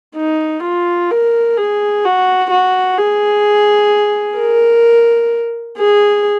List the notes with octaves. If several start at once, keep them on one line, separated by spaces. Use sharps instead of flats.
D#4
F4
A#4
G#4
F#4
F#4
G#4
A#4
G#4